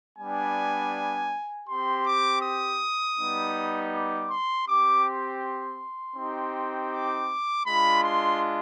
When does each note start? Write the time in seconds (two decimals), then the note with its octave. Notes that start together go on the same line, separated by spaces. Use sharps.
0.19 G3 B3 D4 G#5
1.68 C4 G4 C6
2.06 D6
2.42 D#6
3.18 G3 B3 D#4
3.93 D6
4.30 C6
4.67 C4 G4 D6
5.04 C6
6.16 C4 D#4 G4
6.92 D6
7.66 G#3 D4 F4 B5
8.04 C6